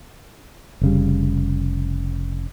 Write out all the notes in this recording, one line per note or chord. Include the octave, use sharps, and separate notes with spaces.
F1 C#3 G3